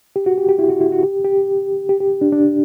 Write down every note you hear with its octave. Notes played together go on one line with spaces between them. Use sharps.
G4
F#4
G4
G4
E4
F#4
E4
F#4
G4
G4
G4
G4
D4
D4